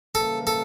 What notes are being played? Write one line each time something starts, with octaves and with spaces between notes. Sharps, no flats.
C#3 E3 G3 A#3 A4
A4